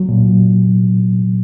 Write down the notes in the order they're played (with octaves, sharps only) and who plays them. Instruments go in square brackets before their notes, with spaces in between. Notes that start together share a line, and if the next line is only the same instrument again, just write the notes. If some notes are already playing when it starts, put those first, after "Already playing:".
Already playing: [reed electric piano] F#3
A#2